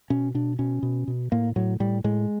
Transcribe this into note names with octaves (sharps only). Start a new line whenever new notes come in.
B2 C#4
B2 D4
B2 C#4
B2
B2
A2 A#3
A2 F#3
A2 G3
A2 G#3